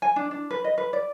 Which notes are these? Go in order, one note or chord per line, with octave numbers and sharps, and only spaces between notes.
G#5
D4
D4
B4
D#5
B4
D5